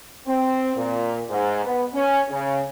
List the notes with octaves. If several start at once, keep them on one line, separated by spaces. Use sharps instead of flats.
C4
A#2
G#2
B3
C#4
C#3